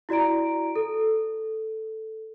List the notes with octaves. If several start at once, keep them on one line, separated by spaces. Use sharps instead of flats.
E4 F#4 D5 A#5 D7
A4